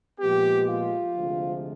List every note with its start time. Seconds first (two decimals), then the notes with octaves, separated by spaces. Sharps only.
0.20 A#2 F3 G#3 B3 G4
0.67 F4
1.15 D2 C3 F3 G#3